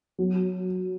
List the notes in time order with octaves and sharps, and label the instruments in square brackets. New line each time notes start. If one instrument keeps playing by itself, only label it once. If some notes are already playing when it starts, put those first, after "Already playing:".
[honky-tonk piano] F#3